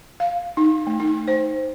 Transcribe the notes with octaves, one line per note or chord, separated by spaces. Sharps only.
F5
D#4
A3
D#4
C5